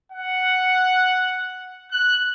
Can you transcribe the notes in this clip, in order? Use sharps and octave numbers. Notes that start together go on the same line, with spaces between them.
F#5
F#6